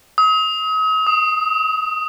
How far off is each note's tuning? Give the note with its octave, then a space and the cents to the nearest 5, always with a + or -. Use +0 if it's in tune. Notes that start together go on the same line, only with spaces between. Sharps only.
D#6 +40
D#6 +10